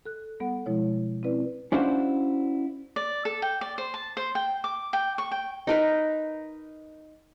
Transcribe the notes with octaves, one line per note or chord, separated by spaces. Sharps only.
A4 F#6
G3 B3 A4 F#5
B2 F3 G#3 E4 C#5
C4 C#4 E4 B4 D5
C#4 D4 E4 F#4 C5 F5
D5
A4
G5
D5
C5
A5
C5
G5
D6
G5
C#6
G5
D#4 A#4 B4